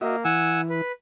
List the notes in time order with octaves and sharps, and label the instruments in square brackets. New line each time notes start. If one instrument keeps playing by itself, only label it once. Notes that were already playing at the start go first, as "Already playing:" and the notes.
[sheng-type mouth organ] A#3 [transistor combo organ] F#4 D#5 E5
[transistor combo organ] E3 [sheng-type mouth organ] F#5 G#5 E6
[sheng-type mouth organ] B4